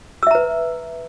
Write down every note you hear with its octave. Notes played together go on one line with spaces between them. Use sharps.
B4 E5 A#5 E6